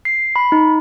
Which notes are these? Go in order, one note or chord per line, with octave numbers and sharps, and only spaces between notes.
C7
B5
D#4